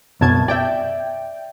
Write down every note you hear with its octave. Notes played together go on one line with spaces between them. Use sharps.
C2 F#2 B2 A5 G#6
D5 E5 G5